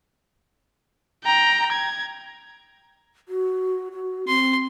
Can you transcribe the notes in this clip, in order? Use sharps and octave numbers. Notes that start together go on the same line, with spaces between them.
G5 A#5
G#6
F#4
F#4
C4 C6